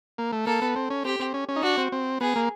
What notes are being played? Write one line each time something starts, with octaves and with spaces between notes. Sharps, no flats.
A#3
A3
A#3 A4
B3
C4
C#4
C4 G4
C4
C#4
C#4
D#4
D4 F#4
C4
C4
B3 G#4
A#3